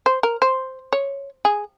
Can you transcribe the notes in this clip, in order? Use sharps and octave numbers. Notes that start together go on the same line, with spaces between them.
C5
A#4
C5
C#5
G#4